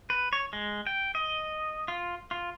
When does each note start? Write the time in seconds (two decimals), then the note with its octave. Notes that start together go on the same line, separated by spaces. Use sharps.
0.10 B4
0.33 C#5
0.53 G#3
0.87 G5
1.15 D#5
1.88 F4
2.31 F4